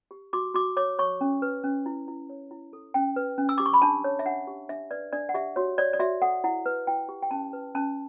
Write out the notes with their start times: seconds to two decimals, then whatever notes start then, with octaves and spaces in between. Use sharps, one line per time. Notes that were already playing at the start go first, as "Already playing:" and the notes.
0.11 G4
0.33 F#4 D6
0.54 F#4 D6
0.77 C#5 D6
0.99 C#5 C#6
1.21 C#4
1.42 B4
1.64 C#4
1.86 E4
2.08 E4
2.29 C#5
2.51 E4
2.73 A4
2.94 C#4 G5
3.16 B4
3.38 C#4
3.49 E6
3.58 G4 D6
3.66 C#6
3.74 B5
3.82 D4 A5
4.04 C#5
4.19 E5
4.26 D4 F#5
4.47 G4
4.69 D4 E5
4.91 B4 D5
5.12 D4 D5
5.29 F#5
5.34 G4 E5
5.56 F#4 C#5
5.78 C#5 D5
5.93 D5
6.00 F#4 E5
6.22 A4 F#5
6.44 E4 F#5
6.66 B4
6.87 E4 G5
7.09 G4
7.22 G5
7.31 C#4 A5
7.53 B4
7.75 C#4 A5